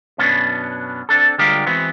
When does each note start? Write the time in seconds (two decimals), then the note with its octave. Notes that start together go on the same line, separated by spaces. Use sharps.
0.18 F#2 B2 B3 C#4 D4
1.09 C4 D4 A4
1.38 D3 G3 G#3 F4 G4 A#4
1.66 E3 G#3 B3 C4 F#4